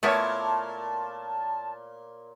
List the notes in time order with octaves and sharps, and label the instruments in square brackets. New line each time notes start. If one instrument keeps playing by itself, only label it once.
[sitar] A#2 A#4 C#5 [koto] A3 B3 E4 [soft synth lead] A5